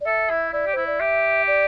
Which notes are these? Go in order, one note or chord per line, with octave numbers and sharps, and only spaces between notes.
D5
A4 E5
E4
E4 D5
G4
E4 C5
D5
G4 E5
D5